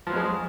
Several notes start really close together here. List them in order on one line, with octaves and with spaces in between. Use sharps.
F3 F#3 F2 G#3